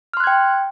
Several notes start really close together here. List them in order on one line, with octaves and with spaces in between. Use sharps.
F6 C6 F#6 G#6 G5